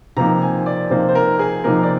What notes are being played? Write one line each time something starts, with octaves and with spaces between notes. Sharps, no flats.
C3 F3 A#3 D#4 A#5
G#5
D5
C3 F3 A#3 D#4 C5
C5
A#4
G#4
C3 F3 A#3 D#4 A#4
D5